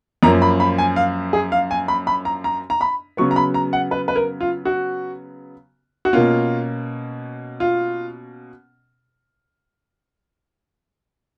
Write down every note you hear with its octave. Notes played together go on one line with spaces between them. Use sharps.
F#2 F3 A#3 C#4 A#5
B5
B5
G#5
F5
G#4
F5
G#5
B5
B5
A#5
A#5
A#5
B5
C#3 F#3 B3 C#6
A#5
B5
A#5
F#5
B4
B4
A#4
F4
F#4
F#4
B2 A#3 C#4 F4
F4